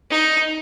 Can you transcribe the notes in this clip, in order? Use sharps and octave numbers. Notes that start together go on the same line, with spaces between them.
D#4